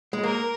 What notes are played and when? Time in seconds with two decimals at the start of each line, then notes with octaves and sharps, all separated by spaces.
0.13 G#3
0.24 A#3 A#4